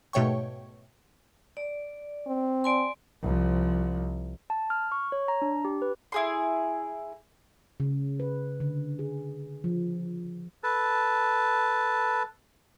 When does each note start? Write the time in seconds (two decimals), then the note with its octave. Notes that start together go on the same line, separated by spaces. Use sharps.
0.13 G#2 B2 A3 C#5 G5 C#6
1.57 D5
2.27 C4
2.64 D5 G#5 C6
3.22 C2 F3
4.50 A5
4.70 F6
4.92 C#6
5.12 C#5
5.28 A#5
5.42 D4
5.65 G4
5.82 B4
6.12 E4 G#4 C6
7.80 C#3
8.20 B4
8.60 D3
8.99 G#4
9.64 F3
10.64 A4 B4 A5